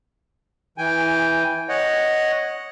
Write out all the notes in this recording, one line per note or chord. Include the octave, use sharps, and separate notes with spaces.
E3 G5 G#5
C#5 D#5 F#5